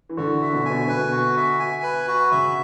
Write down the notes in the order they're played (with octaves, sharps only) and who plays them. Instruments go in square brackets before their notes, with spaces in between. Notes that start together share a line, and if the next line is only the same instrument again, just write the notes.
[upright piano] E3
[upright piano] D3 [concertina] F#4
[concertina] E5
[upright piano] B2
[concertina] G#5
[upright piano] B2
[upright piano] B2 [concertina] B4
[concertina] F#4
E5
G#5
B4
F#4
[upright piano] C#3 [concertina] E5